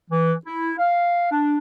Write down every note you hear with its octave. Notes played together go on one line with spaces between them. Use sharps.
E3
E4
F5
D4